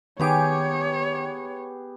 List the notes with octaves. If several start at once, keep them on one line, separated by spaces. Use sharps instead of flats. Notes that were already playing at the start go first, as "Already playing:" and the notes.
D#3 B3 G4 G#4 C#5 G5 D6